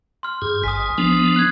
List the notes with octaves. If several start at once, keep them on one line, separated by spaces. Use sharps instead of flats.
C6 F6
G2 G#4
G#1 G#5 D#6 B6
F3 B3 D4 D#6
F#6 G#6